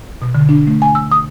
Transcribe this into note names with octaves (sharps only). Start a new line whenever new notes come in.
B2
D3
D4
A3
G#5
E6
D#6